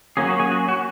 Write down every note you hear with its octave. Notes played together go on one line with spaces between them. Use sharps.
F#3 A#3 C#4 G#4
F#4
G#4
F#4
F#4